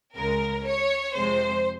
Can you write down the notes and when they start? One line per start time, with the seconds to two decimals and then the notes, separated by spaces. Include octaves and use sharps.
0.16 C#2 C#3 G#3 A#4
0.65 C#5
1.14 F2 C3 F3 G#3 C5